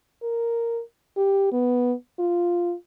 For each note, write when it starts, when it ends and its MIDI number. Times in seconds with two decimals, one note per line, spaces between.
0.23 0.81 70
1.17 1.48 67
1.52 1.93 59
2.19 2.74 65